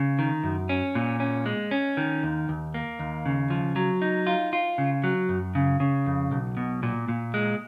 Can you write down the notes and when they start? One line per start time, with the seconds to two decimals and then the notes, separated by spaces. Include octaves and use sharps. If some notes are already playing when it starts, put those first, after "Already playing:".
Already playing: C#3
0.19 D#3
0.44 F#2
0.69 C#4
0.95 A#2
1.20 C#4
1.46 G#3
1.71 C#4
1.97 D#3
2.23 D#2
2.49 D#2
2.74 A#3
2.99 D#2
3.26 C#3
3.50 F3
3.76 F#3
4.02 D#4
4.27 F4
4.53 F4
4.78 C#3
5.04 F#3
5.29 F#2
5.55 C#3
5.80 C#3
6.06 F2
6.31 B1
6.57 B2
6.83 A#2
7.09 A#2
7.34 G#3